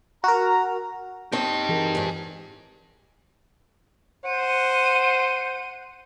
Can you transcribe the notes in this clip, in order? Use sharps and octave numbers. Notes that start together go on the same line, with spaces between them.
F#4 A#4 A#5
C4 D#4 G4 C#5 A5
E3 G#4 A#4
E2 G#2
C5 F#5 D#7